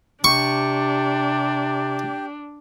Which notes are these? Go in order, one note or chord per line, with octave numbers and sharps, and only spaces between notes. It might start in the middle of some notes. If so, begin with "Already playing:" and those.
C3 D4 G4 C#6